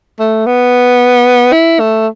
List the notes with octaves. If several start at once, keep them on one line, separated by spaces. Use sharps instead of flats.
A3
B3
E4
A3